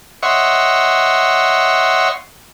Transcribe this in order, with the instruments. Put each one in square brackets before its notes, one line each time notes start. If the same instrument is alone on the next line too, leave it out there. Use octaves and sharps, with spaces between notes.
[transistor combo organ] C#5 D#5 E5 F#5 C6 C#6